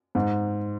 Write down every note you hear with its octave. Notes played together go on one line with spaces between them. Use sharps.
G#2